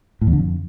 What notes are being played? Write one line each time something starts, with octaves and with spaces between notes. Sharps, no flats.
A2
E2
D3
F2